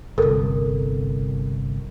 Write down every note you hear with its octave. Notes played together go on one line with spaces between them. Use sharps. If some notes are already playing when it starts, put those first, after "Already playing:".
G1 C2 A4 A#4